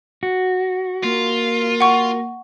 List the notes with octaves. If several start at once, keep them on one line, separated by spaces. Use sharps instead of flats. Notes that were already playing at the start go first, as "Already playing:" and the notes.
F#4
A#3 F4
F#5 C#6